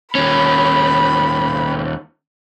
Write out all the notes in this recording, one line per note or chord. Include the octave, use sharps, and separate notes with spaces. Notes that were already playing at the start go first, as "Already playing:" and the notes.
D#2 C#4 B5